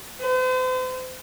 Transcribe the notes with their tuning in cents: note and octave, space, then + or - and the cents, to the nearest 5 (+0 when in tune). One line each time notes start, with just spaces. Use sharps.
C5 -45